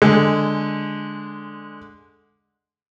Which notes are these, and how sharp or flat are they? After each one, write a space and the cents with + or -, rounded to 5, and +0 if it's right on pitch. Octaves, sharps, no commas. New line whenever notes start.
D3 +0 G#3 +0 G#5 -15